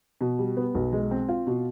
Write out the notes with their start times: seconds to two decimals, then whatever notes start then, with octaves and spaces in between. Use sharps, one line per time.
0.21 B2
0.39 G3
0.57 B3
0.75 B1
0.93 G#3
1.11 C4
1.29 F4
1.47 B2